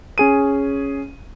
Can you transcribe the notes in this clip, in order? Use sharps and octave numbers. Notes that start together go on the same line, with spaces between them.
C#4 G#4 D#7